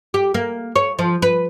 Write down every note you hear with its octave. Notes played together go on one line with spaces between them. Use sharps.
G4
A#3
C#5
F3
B4